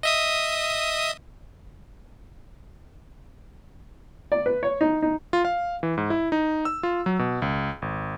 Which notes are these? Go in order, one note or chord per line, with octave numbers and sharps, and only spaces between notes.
D#5 E5 D#6
D5
B4
C#5
D#4
D#4
F4
F5
E3
G#2
E4
D#4
E6
F4
F#3
B2
C#2
G#1